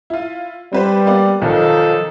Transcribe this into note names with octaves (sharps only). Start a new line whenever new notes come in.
E4 F4
G3 C4 B4 C5
A#3 B3 D5
B1 D#3 F3 D#4 A4